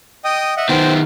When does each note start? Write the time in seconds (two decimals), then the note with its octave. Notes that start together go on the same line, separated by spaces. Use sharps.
0.25 D#5 G5 D#6
0.57 D#5 E5 F#5
0.69 D#3 B3 C5 G5